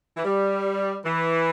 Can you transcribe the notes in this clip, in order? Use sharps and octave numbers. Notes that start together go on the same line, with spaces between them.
E3
G3
E3